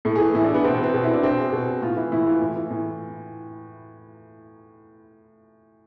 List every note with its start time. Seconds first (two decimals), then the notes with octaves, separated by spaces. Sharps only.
0.05 A2 A4
0.16 G#4
0.20 E3
0.34 A2 E4
0.45 D4
0.49 E3
0.54 B3
0.64 B2 C4
0.74 B3
0.84 C4
0.94 B2
1.03 E4
1.14 D4
1.23 B2 C4
1.38 G#4
1.52 B2
1.82 A2 F4
1.97 E3 E4
2.12 A2 E4
2.26 E3 F4
2.41 A2
2.56 E3
2.71 A2